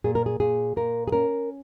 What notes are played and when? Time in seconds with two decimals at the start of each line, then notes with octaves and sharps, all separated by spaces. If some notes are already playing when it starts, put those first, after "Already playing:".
0.04 A#2 G#4
0.15 A#4
0.26 G#4
0.40 A#2 G#4
0.76 A#2 A#4
1.08 G#4
1.12 C#4 A#4